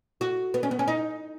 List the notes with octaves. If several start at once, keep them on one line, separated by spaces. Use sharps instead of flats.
F#4
B3
C#4
B3
C#4
D#4